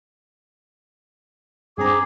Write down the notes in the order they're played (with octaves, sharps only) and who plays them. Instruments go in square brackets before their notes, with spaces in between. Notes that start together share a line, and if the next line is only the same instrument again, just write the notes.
[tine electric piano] G2 C4 A#5 [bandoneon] G#4 [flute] D6